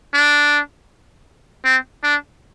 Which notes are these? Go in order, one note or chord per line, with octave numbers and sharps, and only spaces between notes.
D4
C4
D4